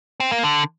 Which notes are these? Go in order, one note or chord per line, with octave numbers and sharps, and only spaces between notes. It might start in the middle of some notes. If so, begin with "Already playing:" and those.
C4
A#3
D3